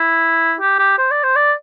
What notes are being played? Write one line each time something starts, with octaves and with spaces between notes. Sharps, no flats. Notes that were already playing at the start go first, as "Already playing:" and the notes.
Already playing: E4
G4
G4
C5
D5
C5
D5